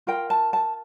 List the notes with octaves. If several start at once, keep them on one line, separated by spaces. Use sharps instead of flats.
F4 A#4 G5
A5
A5